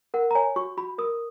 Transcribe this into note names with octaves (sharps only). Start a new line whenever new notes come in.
A#4 F#5
A#5
C#5 G#5
F#4 C#6
F#4 B5
A#4 D#6